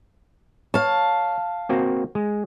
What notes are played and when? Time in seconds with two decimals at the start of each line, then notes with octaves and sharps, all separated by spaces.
0.74 C#5 F5 A5
1.69 A#3 C4 F#4
2.15 G#3